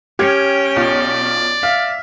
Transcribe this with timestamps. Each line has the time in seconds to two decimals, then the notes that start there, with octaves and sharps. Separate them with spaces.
0.19 C#4 G4 G5 F6 G#6
0.77 B1 F4 C#5 D5
1.63 E5 F5 F6